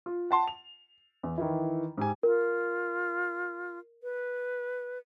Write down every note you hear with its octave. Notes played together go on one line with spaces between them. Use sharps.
F4
F#5 A5 C6
F7
E2
D#3 E3 E4
G#2 G4 G#5
F4 A#4
B4